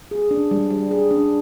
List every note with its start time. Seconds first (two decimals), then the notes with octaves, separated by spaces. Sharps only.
0.11 G#4
0.31 D4
0.51 G3
0.70 G3
0.91 G#4
1.11 D4